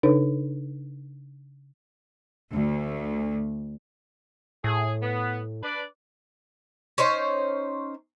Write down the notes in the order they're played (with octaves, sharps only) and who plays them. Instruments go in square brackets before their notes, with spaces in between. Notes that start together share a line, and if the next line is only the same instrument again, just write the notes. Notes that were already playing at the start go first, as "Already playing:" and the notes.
[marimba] C#3 D4 D#4 A4 B4 C#5
[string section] D2
[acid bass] A2 [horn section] G#4
[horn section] B3
D4 B4 D5
[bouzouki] C#4 D#4 C5 C#5